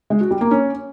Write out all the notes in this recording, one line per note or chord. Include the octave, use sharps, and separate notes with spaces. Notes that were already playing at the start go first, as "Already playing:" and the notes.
G#3
F#4
G3
A#3
C#4